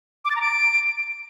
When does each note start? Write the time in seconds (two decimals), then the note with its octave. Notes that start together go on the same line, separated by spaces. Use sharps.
0.25 D6
0.30 A6
0.36 A#5
0.41 D7